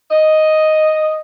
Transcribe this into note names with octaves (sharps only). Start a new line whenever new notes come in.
D#5